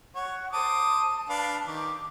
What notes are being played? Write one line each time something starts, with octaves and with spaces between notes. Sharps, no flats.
C#5 F#5
C5 A5 D6 D#6
D4 B4 F5
D#3 D6